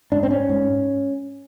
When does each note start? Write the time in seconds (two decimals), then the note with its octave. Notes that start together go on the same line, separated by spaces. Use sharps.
0.12 G#2 D4
0.23 C4
0.31 C#4
0.49 G#2